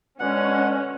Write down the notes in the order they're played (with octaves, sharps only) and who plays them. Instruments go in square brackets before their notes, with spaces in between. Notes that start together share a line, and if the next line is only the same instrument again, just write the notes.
[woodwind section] B2 D3 G#3 [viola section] C#4 [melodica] F#5